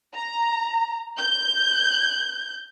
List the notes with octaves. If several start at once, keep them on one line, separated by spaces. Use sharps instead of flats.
A#5
G6